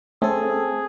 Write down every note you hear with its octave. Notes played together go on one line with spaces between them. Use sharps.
A3 C4 C#4 G#4 A4